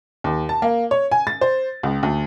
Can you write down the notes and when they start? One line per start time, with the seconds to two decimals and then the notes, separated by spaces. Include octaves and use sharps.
0.24 D#2
0.49 A5
0.62 A#3
0.91 C#5
1.11 G#5
1.27 A6
1.41 C5
1.83 C#2
2.03 D2